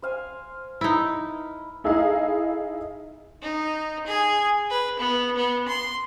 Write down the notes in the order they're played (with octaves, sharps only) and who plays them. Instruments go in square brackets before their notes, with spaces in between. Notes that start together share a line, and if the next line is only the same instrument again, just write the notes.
[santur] C5 F5 G#5
[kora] D#4 E4 [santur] B4
[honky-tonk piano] D#4 E4 G#4 A4 D#5 F5
[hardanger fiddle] D#4
G#4
B4
B3
B3
C6